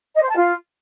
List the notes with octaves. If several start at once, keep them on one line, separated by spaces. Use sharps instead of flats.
D#5
C5
A5
F4